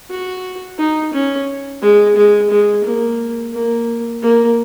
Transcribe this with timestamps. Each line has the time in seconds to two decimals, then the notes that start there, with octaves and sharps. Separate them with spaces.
0.10 F#4
0.78 D#4
1.13 C#4
1.82 G#3
2.16 G#3
2.50 G#3
2.84 A#3
3.54 A#3
4.22 A#3